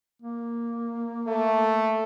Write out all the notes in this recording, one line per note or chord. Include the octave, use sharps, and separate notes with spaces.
A#3
A3